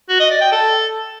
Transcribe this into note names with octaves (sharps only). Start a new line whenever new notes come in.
F#4
D#5
D5
G5
A4